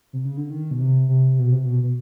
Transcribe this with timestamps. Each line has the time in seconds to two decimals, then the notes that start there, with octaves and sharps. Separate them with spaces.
0.13 C3
0.25 C#3
0.37 D3
0.50 D#3
0.71 B2
0.80 C3
1.09 C3
1.39 B2
1.52 C3
1.66 B2
1.83 B2